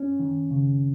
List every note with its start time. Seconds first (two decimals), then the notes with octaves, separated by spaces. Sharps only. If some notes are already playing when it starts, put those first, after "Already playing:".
Already playing: C#4
0.20 D#3
0.51 C#3